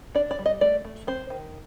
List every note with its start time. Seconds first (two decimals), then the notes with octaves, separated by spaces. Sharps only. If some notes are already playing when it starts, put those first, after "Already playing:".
0.15 D4 D5
0.31 D5
0.39 G3
0.46 D#5
0.61 A3 D5
0.85 A3
1.07 C4 C5
1.30 D#3